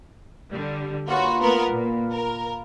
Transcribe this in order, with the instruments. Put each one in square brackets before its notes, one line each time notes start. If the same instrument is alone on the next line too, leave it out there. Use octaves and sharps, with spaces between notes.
[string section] D3 G3
[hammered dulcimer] A#3 F4 B4 [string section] F#4 C#5
[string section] A3 B3 A#4
A#2
A#4